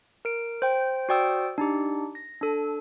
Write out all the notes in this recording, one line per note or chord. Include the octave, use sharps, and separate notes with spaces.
A#4 D7
C5 G5
F#4 C5 D5 G5 D#6 E6
D4 D#4 G4
A#6
D4 A4